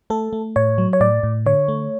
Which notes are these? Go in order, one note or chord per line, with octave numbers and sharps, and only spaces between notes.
A3 A4
A3
A2 C#5
F#3
C#5
A2 D5
A2
D3 C#5
A3